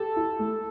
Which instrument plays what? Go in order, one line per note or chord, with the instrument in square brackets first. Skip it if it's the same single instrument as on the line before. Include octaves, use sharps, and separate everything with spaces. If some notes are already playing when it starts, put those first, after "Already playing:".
Already playing: [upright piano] G4 [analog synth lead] A4
[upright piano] E4
A3